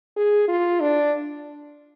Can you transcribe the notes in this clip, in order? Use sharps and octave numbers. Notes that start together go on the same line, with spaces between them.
G#4
F4
D4